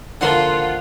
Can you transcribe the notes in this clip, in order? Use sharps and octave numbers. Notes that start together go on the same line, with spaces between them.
D3 F3 A#3 F4 F#5 C6